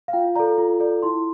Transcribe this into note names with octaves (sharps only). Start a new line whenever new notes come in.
F5
F4 G5
A4 D5 A#5
F4
A4 D5
E4 C6